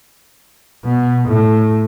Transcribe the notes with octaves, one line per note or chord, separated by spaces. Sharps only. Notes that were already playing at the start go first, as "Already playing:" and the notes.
B2
A2